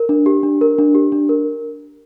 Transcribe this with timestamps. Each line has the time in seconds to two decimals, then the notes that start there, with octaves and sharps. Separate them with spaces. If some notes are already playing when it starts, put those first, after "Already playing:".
Already playing: A#4
0.09 D4
0.26 G4
0.43 D4
0.61 A#4
0.78 D4
0.95 G4
1.12 D4
1.29 A#4